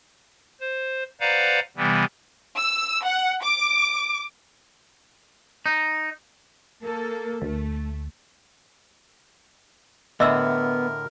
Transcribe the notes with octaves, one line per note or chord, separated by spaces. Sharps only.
C5
B4 C5 D5 F5 F#5 A#5
C3 E3 G3 B3
E6
F#5
D6
D#4
A#3 A4 A#4
D2 A3
A2 D3 B3 A#4 D#5 E5 E6